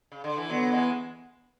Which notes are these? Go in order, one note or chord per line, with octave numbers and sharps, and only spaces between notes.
C#3
D3
E3
D3 F#3 B3
E3 G#3